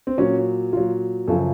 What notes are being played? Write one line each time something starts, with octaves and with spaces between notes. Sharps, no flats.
C4
A#2 F#3 C#4
A#2 F#3 F4
F#2 C#3 F3 A4